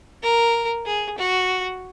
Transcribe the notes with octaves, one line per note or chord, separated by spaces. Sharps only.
A#4
G#4
F#4